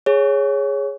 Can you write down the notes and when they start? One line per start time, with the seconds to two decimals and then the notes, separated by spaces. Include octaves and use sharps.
0.06 G#4 C#5